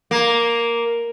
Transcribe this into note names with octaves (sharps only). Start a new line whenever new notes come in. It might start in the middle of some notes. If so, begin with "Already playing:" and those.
A#3